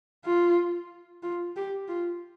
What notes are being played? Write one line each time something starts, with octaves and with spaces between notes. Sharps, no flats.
F4
F4
G4
F4